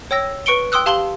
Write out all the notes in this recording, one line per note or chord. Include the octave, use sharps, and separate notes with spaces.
C#5 G5 E6 A#6
B4 C#6 C#7 D7 G7
G5 C6 D#6 E6 F#6
G4 F5 A5 C6 F#7 G7